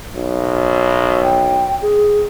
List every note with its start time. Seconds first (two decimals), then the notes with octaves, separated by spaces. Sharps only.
0.15 B1
1.23 G5
1.82 G#4